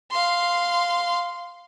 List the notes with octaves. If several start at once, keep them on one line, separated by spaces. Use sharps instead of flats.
F5 C6